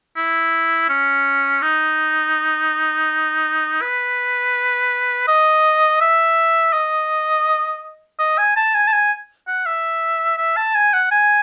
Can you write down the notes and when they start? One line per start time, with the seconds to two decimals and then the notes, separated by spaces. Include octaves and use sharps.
0.17 E4
0.89 C#4
1.62 D#4
3.81 B4
5.28 D#5
6.01 E5
6.73 D#5
8.19 D#5
8.38 G#5
8.56 A5
8.75 G#5
8.87 A5
8.93 G#5
9.48 F#5
9.66 E5
10.38 E5
10.57 A5
10.75 G#5
10.94 F#5
11.11 G#5